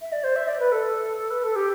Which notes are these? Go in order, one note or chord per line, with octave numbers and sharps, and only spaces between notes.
E5
D5
C5
E5
D5
B4
A4
B4
A4
G4